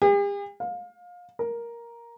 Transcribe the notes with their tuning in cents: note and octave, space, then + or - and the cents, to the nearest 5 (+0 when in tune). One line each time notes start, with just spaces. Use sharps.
G4 +45
F5 +25
A#4 +5